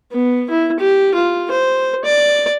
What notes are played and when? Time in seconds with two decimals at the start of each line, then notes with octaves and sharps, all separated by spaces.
0.12 B3
0.50 E4
0.80 G4
1.14 F4
1.51 C5
2.04 D5